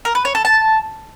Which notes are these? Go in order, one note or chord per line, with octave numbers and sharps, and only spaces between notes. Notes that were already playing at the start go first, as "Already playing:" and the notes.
A#4
B4
C#5
A4
A5